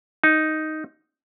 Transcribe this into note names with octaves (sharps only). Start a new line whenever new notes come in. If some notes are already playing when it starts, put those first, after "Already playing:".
D#4